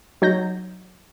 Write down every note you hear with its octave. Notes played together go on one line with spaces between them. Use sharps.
F#3 D#4 G6 A#6